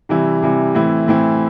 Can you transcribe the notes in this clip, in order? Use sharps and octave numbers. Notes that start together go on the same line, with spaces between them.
C3 E3 G3 E4
C3 E3 G3 E4
A2 E3 C4 E4
A2 E3 C4 E4